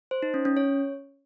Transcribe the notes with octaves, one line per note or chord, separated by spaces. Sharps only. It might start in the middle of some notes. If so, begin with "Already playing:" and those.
C5
D#4
C#4
C#4
C#5